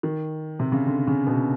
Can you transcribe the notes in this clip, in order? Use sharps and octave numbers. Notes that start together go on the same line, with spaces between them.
D#3
C3
C#3
D3
C#3
B2